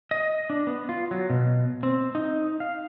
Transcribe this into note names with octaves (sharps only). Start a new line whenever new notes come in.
D#5
D4
B3
F4
F#3
B2
C4
D#4
F5